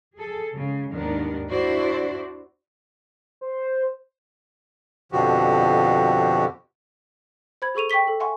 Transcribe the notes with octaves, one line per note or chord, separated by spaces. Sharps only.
G#4 A4
C#3 G#3
D#2 G#2 D#3 B3 D4 A#4
D4 E4 F#4 C5 D5
C5
F2 B2 D3 F3 F#4 G4
C5 B5 G#6
G#4 A4 C#6 D#7 F7
G5 C#6 D6 B6 G7
A4
E5 F#5 G#5 C6 C#6